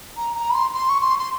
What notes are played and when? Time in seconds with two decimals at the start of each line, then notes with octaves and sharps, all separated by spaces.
0.17 A#5
0.36 A#5
0.50 B5
0.54 C6
0.74 C6
0.89 C#6
1.01 C6
1.18 C6